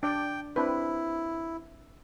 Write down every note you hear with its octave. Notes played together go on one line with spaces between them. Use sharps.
D4 D5 G5
C4 D4 E4 B4